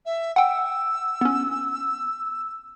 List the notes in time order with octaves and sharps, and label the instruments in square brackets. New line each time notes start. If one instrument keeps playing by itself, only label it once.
[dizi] E5
[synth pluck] F#5 G5 [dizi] E6
[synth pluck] B3 C#4